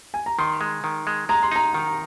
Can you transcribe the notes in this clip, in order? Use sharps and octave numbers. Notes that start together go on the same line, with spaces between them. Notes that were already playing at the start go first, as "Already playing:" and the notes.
G#5
A#5
D#3 C6
G#3
D#3
G#3
G#3 A#5
C6
D#4 A#5
D#3